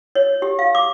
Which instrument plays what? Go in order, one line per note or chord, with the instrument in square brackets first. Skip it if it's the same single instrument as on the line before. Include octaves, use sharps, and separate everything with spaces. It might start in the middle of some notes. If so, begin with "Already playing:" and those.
[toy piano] C#5
G4
F5
D6